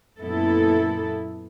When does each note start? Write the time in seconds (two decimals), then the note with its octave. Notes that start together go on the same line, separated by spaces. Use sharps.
0.19 F#2 A#2 B3 E4 A4